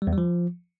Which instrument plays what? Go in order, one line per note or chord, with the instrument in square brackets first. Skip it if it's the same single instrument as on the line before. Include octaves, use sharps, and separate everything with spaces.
[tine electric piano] G3
E2
G3
F3